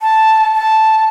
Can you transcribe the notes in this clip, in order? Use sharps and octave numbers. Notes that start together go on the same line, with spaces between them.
A5
A5